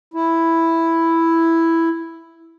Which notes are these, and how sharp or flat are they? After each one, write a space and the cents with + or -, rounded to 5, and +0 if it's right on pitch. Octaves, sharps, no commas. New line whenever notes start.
E4 +0